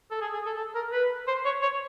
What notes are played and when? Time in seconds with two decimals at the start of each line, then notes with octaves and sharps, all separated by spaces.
0.11 A4
0.21 G#4
0.33 G#4
0.46 A4
0.57 A4
0.75 A#4
0.92 B4
1.27 C5
1.45 C#5
1.62 C#5